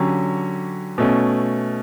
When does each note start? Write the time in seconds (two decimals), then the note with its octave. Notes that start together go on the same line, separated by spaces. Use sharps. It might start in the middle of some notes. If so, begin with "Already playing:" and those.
Already playing: D3 F#3 C#4 G4
0.98 B2 A3 C#4